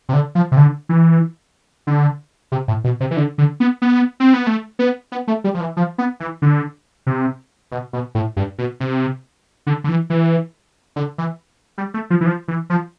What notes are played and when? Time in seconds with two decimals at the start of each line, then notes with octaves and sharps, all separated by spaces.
0.09 C3
0.13 D3
0.35 F3
0.52 C3
0.57 D3
0.89 E3
1.87 D3
2.52 C3
2.68 A2
2.84 B2
3.00 C3
3.11 E3
3.17 D3
3.38 D3
3.60 B3
3.82 B3
4.20 C4
4.34 B3
4.47 A3
4.79 B3
5.12 B3
5.28 A3
5.44 G3
5.54 F3
5.61 E3
5.77 F3
5.98 B3
6.20 E3
6.42 D3
7.07 C3
7.72 B2
7.93 B2
8.15 A2
8.37 G2
8.58 B2
8.80 C3
9.67 D3
9.84 D3
9.89 E3
10.10 E3
10.96 D3
11.18 E3
11.78 G3
11.94 A3
12.10 F3
12.21 E3
12.26 F3
12.48 E3
12.70 F3